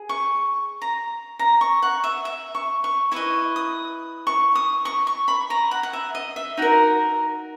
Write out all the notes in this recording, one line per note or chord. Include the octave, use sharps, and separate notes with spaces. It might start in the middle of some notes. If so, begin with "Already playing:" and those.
Already playing: G#4
C#6
A#5
A#5
C#6
F#5
E5
E5
C#6
C#6
E4 B4 D#5 C#6
D#6
C#6
D#6
C#6
C#6
B5
A#5
F#5
F#5
E5
D#5
E5
D#4 F#4 A#4 F#5